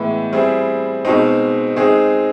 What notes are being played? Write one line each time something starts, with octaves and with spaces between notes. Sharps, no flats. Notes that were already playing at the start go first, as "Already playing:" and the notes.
Already playing: A2 E3 G#3 B3 E4
G3 C4 E4 G#4
B2 G#3 C4 D#4
G#3 C4 D#4 G#4